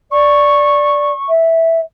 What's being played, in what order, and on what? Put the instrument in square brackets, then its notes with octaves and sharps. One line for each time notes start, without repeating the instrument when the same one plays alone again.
[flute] D5 [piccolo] C#6
[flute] E5